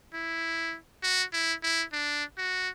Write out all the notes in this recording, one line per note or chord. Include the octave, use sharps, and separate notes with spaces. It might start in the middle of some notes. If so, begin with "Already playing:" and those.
E4
F#4
E4
E4
D4
F#4